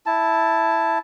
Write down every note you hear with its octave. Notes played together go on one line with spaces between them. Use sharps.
E4 A5